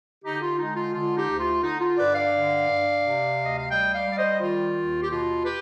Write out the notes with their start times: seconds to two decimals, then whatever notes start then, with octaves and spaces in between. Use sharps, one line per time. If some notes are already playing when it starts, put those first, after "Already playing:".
0.24 D3 D#4 G4
0.42 F4
0.59 G#3 D#4
0.76 F4
0.94 D3 F4
1.17 D#4 G4
1.29 D2
1.40 F4
1.63 D3 D#4
1.81 F4
1.98 G2 B4 D5
2.15 D5 F5
2.32 D3
2.68 G2
3.02 C3
3.37 D2
3.45 D#5
3.59 F5
3.71 G3 D#5 G5
3.95 D5 F5
4.06 G3 D5
4.18 C5 D#5
4.41 D#3 F4
4.75 D#2
5.03 G4
5.10 B2 F4
5.45 G4 B4